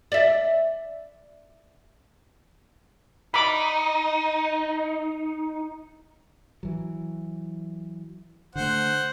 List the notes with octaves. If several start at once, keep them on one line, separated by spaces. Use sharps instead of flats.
D5 E5
D#4 B5 D6
E3 F#3
D3 A3 C5 F#5